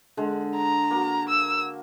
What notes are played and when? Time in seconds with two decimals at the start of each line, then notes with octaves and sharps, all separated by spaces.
0.17 D3 G#3
0.56 A#5
0.91 A#3 F#4
1.29 E6